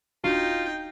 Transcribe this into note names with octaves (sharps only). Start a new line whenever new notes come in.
D1 D4 D#4 F4 F#4 G5